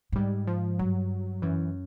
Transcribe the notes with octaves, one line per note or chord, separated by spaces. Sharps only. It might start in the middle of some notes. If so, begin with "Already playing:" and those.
A2
G#2 G3
F3
G2 F#3
F#2 E3